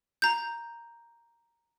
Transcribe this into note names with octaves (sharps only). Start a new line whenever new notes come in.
A#5 G6